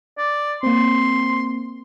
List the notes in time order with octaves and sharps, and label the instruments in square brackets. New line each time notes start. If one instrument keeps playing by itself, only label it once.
[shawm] D5
[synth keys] A#3 C4 [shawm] C6